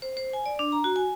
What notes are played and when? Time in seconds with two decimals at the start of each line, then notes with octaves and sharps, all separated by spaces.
0.02 C5
0.17 C5
0.33 G#5
0.46 D5
0.59 D4
0.72 A#5
0.84 F#4
0.96 G#5